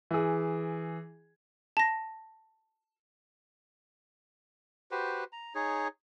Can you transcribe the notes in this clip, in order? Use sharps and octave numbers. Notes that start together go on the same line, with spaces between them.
E3 G#4
A5 A#6
F#4 G4 B4 C5
A#5
D#4 G#4 C#5